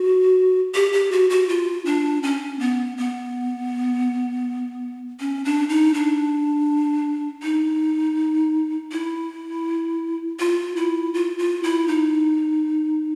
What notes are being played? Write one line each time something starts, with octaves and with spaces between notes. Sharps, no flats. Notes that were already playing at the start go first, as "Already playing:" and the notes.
Already playing: F#4
G4
G4
F#4
F#4
F4
D4
C#4
B3
B3
C#4
D4
D#4
D4
D#4
E4
F4
E4
F4
F4
E4
D#4